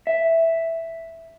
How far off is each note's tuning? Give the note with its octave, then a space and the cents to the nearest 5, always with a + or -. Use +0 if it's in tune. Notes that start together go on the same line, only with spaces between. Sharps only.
E5 +0